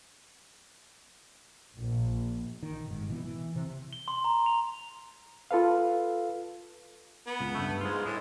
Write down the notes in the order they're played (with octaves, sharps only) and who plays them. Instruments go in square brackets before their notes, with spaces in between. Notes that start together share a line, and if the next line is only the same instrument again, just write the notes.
[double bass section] A#1
[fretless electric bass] D#3
G1 G#2
B2 E3 B3
E3
C3
[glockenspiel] G7
C6
A#5
F7
[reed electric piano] F4 A4 B4 F5
[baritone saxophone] B3
[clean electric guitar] C#2
G2 A3
[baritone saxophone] G#2 [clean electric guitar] G#3 F4
[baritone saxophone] A2 [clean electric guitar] G#3